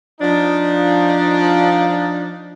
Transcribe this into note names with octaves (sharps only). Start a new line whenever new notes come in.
F3 D4 D#4